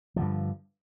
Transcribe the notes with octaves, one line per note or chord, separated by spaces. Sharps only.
G2 D3 F3